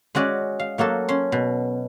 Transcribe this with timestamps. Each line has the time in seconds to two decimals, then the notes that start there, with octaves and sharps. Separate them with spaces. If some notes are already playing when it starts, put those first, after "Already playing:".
0.15 G#3 C#4 F#4 D5 D#5
0.60 F5
0.78 F#3 A#3 F#4 A4
1.09 C#4 C6
1.32 B2